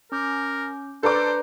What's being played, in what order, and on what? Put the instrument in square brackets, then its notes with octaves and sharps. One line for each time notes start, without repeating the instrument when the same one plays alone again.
[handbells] C#4 D6 G6 [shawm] A#4
[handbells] D4 B4 A#5 [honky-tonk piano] A4 D5 D6 [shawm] C5